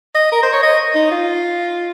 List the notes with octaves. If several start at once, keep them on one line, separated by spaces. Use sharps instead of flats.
D#5
A#4
C5
C#5
D#5
D#4
F4